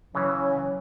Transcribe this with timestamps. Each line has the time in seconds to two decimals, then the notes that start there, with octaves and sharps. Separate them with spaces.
0.15 C#3 E3 F#3 C#4